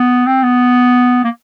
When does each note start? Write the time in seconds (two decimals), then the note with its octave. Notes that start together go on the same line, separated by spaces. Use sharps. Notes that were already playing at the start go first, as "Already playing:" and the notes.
Already playing: B3
0.26 C4
0.43 B3
1.24 A#3